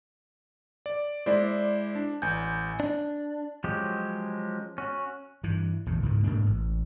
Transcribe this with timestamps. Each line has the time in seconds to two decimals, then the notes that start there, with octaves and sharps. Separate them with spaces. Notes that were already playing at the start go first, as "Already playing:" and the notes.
0.86 D5
1.26 G#3 E4 C5 D5
1.95 D4
2.22 A1 G#5 G6
2.80 D4
3.64 F3 F#3 G#3 C#4 G4
4.78 C#4 F#4
5.43 G2 E3
5.86 A#1 E2 A2
6.03 C#2 G#2 B2
6.24 G#2 B2 A#3 D4
6.46 A1